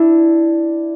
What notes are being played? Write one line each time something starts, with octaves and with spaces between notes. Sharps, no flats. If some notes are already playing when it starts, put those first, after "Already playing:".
Already playing: D4 E4